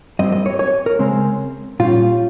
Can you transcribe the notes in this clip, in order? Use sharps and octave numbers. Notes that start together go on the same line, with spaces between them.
G2 G3 C4 D#5
D#5
C#5
C#5
A#4
C#3 G#3 C4
A#2 G3 C#4 F4